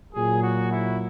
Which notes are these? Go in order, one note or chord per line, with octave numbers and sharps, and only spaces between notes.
A#2 F#3 G#4
F#4
E4